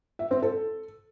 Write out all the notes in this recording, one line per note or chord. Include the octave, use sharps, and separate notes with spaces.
E5
C4
A4